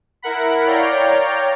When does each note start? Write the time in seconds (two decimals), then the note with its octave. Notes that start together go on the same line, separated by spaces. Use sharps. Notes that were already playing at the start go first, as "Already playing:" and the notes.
0.22 E4 A#4 F#5 B5
0.66 C#5 D5 F5 G5 A#5